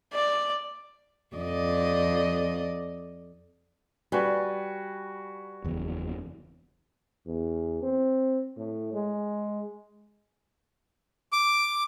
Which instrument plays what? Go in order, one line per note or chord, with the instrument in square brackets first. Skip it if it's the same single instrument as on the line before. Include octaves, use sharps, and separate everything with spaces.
[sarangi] D5
[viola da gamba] F2 D5 D#5
[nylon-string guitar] G3 [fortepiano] F#4 B4 G#5
[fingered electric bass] F#1 E2
[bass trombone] E2
C4
A2
G#3
[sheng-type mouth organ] D6